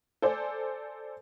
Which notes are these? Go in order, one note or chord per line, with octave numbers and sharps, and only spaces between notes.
A4 C5 D5 G#5